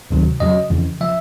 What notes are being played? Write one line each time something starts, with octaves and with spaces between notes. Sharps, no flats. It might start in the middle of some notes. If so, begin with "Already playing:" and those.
D2 C3 D#3 F#3
F2 C#3 F#3 D#5
F2 C#3 E3
C#3 F3 E5